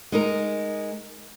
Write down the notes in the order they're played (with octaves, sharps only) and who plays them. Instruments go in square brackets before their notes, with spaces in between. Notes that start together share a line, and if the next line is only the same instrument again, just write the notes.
[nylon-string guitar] G#3 D#4 A#4